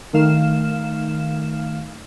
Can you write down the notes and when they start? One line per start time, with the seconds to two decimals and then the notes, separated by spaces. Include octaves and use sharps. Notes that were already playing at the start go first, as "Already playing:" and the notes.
0.13 D#3 A3 D#4 F5 F6 E7